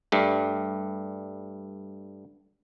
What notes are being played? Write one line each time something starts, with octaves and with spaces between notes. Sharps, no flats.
G2 G3 A3